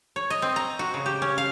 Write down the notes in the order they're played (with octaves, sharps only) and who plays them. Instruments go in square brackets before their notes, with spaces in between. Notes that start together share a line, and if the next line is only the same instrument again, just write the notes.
[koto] C#5
D#5
C4
A#5
F#4
C#3
G4
C#4
F5